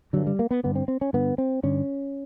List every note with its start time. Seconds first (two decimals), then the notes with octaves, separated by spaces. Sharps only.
0.13 G2 D3 F#3
0.27 G3
0.39 A#3
0.51 B3
0.64 G2 D3 B3
0.76 C4
0.88 C4
1.01 C#4
1.13 G2 D3 B3
1.38 C4
1.63 G2 D3 C#4